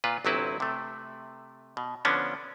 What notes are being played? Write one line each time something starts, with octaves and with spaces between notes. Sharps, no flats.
A#2 F4 B4
G1 C3 F#3 C4 E4 B4
C3 A3
B2
D3 F3 B3 C#4 D4